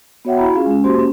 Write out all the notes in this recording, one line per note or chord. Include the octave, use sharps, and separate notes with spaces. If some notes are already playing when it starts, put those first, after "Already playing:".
B3 F#4 C#5 E5 F#5 G5
E4 F#4 A#5 B5
C#4 F4 G#4 F5
G#3 C#4
A#3 F#4 G4 C5 C6
C#4